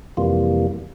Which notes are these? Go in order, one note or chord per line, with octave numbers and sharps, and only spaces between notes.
F2 C3 E3 G3 A#3 F4